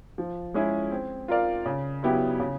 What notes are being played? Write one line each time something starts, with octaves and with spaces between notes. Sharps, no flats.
F3
G#3 C#4 E4 G#4
C4
F4 A#4 D5 F5
C#3
F#3 B3 E4 G4
C#3